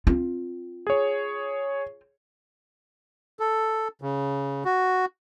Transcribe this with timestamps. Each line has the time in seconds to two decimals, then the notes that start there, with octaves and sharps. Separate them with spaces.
0.07 C4 F4
0.87 G#4 C#5
3.39 A4
4.02 C#3
4.65 F#4